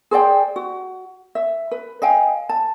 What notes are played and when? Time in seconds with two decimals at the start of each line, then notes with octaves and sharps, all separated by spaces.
0.11 G#4 C5 D5 G5
0.56 F#4
1.35 E5
1.71 B4
2.02 D#5 F5 G5 G#5
2.49 A5